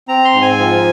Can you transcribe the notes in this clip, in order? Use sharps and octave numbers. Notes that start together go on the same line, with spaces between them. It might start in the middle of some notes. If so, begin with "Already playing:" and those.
C4 A#5
C6
G#2
G#5
F3